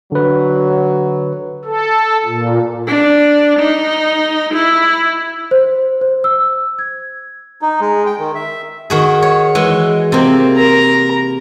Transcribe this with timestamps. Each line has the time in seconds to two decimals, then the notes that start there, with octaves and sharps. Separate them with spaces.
0.12 D3 F#3 B4
1.64 A4
2.24 A#2
2.88 D4
3.59 D#4
4.54 E4
5.51 C5
6.01 C5
6.24 E6
6.79 G#6
7.62 D#4
7.80 G#3
8.06 G5
8.19 D#3
8.35 E5
8.90 D#3 F#4 G#4
9.22 C#5
9.55 E3 G#3
10.12 C3 A#3 C4
10.56 A#4 A#5